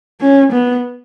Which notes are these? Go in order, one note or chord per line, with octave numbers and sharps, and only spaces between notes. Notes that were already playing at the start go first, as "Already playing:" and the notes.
C#4
B3